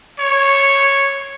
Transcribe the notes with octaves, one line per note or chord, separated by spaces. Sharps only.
C#5